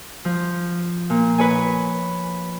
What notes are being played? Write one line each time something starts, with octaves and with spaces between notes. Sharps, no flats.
F3
A#2
B4 C#5 G#5